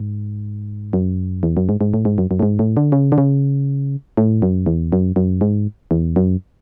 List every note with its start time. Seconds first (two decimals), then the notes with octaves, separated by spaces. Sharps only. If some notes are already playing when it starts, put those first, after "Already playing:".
Already playing: G#2
0.93 F#2
1.43 E2
1.57 F#2
1.69 G#2
1.81 G#2
1.94 A2
2.05 G#2
2.18 F#2
2.31 F#2
2.39 A2
2.43 G#2
2.59 A2
2.77 D3
2.92 C#3
3.12 D3
3.18 C#3
4.17 A2
4.42 F#2
4.66 E2
4.92 F#2
5.16 F#2
5.41 G#2
5.91 E2
6.16 F#2